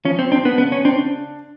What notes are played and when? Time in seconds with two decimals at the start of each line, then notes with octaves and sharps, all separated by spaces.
0.05 F3 C#4
0.19 C4
0.32 C4 D4
0.45 B3
0.58 C#3 B3
0.72 C#4
0.85 C4 D4